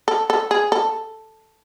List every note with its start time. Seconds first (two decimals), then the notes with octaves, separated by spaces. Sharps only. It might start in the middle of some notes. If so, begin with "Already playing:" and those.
0.08 A4
0.30 A4
0.51 G#4
0.72 A4